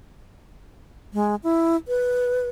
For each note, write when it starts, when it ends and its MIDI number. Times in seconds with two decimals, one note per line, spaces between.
1.14 1.35 56
1.43 1.76 64
1.88 2.49 71